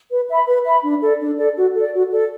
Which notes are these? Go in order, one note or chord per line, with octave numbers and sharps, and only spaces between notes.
B4
E5 B5
B4
E5 B5
D4
A4 D5
D4
A4 D5
F#4
A4 D5
F#4
A4 D5